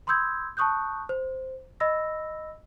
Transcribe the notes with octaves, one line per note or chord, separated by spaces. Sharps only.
B5 C6 D#6 E6 G6 G#6
A5 B5 C#6 D#6 F#6 G6
C5
D#5 B5 E6 A#6